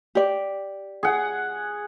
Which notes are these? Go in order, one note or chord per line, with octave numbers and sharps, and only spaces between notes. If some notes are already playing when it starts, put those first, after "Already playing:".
G4 D5
G#4 F#5